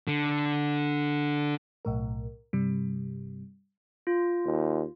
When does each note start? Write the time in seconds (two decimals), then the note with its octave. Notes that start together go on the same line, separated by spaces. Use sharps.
0.08 D3
1.85 B1 A2 A#4
2.53 G2 C3 G3
4.07 F4
4.45 D#2